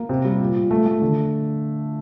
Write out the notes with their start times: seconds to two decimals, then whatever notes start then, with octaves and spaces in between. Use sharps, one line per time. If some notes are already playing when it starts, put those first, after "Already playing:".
Already playing: A#3
0.09 C3
0.25 G3
0.40 A#2
0.56 A#2
0.71 A3
0.86 A3
1.02 D3